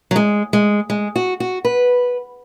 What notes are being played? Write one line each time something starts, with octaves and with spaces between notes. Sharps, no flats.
F#3
G#3
G#3
G#3
F#4
F#4
B4